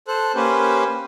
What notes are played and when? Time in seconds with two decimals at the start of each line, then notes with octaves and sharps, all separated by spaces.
0.08 A4 C5 F#6
0.35 A#3 C#4 G4 B4 C5